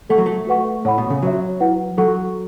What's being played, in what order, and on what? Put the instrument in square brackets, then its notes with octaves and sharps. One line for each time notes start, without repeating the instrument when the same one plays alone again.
[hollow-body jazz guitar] A3 [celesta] A4 F#5 C#6
[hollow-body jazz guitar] F#3
A3
[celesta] F#4 B4 F#5 C#6
[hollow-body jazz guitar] A2 [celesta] C#5 F#5 B5
[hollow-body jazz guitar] B2
C#3
[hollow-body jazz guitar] F#3 [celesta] F#4 C#5 E5
[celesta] E4 B4 F#5
[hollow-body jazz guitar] F#3 [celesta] A4 F#5 C#6